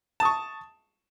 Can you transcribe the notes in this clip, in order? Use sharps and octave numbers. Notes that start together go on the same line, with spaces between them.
A5 C#6 D#6